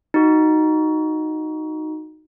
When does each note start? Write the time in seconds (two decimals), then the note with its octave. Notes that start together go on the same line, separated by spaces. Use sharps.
0.14 D#4 F#4